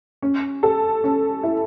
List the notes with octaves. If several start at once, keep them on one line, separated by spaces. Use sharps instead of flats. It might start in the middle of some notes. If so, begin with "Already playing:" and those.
C#4
A4
C#4
E4